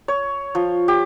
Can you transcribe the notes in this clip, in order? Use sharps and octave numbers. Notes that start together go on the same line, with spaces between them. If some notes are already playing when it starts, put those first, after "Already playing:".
C#5
F3
G4